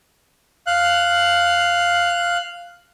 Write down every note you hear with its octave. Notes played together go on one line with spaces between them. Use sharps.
F5 F#6